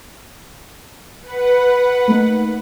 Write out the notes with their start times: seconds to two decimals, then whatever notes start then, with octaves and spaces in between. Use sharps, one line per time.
1.22 B4 F#5
2.08 A3 A#3 D#4